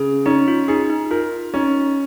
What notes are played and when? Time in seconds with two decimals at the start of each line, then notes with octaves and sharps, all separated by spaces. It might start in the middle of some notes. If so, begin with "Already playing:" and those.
Already playing: C#3 G#4
0.26 C#4 D#4
0.48 F4
0.68 D#4 G#4
0.90 D#4
1.11 F4 A#4
1.54 C#4 D#4